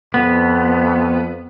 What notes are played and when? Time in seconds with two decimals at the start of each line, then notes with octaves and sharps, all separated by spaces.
0.14 F2 B3